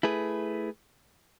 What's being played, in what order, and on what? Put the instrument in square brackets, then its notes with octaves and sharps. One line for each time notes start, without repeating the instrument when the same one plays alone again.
[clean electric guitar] A3 E4 G#4 B4